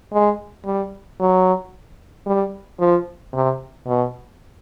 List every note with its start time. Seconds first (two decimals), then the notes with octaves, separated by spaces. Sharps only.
0.13 G#3
0.65 G3
1.20 F#3
2.26 G3
2.80 F3
3.33 C3
3.87 B2